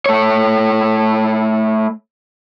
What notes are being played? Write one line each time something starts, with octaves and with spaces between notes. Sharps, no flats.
A3 C#5